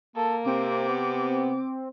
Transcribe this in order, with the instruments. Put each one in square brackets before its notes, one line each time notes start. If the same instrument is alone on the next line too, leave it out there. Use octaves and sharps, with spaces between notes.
[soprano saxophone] A#3 [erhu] A4
[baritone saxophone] C3 [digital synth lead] C4 [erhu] D6
[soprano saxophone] B3